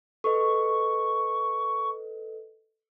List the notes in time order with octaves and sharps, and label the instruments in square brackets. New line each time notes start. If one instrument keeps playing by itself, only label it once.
[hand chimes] A4 B4 D#5 [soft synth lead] C#6